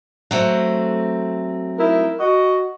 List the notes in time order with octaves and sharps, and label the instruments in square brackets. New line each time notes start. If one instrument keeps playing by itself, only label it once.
[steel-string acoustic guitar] F#3 A3 C4
[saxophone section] D#4 E4 A#4
F#4 D#5